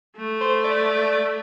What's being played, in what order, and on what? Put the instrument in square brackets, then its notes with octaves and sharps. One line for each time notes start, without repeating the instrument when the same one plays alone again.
[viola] A3
[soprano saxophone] C5
D5